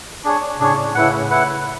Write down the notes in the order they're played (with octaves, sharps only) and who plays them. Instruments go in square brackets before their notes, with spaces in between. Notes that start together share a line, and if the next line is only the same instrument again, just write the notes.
[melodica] D4 G#4 C#5
[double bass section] A2 C#3 [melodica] D4 G#4 C#5
[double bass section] A2 C#3 [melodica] E4 B4 F#5
[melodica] E4 B4 F#5